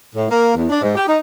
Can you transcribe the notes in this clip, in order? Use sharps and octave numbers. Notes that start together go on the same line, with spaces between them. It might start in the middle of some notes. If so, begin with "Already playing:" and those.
A2
A#3
E2
D4
G#2
G4
D#4